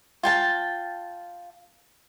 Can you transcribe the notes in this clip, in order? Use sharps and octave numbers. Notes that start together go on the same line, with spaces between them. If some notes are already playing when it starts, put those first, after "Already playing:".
F4 G5 A5